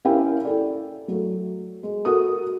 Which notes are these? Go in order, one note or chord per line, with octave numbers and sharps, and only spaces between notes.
C#4 E4 G4 A#4 F5 G5
E4 A4 D5
F#3 A3
G#3
F#4 A4 A#4 D#6